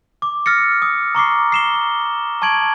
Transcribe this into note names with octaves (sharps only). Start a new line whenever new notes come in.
D6
E6 F6 A6 A#6 C#7
D#6
A#5 C#6 D6 C7
C7 E7 G7
A5 C#6 G#6 D7 F#7